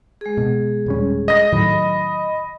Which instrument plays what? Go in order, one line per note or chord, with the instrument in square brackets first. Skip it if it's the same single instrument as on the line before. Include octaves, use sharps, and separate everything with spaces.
[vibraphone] G#3 G#4
[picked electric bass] B2
D#1 G3 C#4
[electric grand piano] D#5 A#6
[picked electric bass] A2 D#3 F#3 [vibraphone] B5